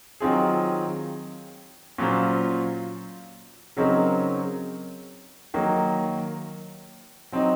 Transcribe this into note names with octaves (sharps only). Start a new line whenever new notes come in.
D#3 F#3 C4 F4 G#4
A#2 F#3 C#4 F4 C5
C#3 F#3 C4 D#4 A#4
D#3 F#3 A#3
F#3 C4 D#4